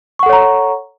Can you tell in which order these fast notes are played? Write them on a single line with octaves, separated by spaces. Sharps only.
C#6 F#5 A4 C#5 A#5